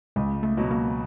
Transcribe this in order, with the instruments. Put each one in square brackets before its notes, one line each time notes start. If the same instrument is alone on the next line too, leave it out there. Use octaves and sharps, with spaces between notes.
[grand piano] C#2 [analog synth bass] G#3
[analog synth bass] A3
[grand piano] B2 F#3
[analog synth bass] A#3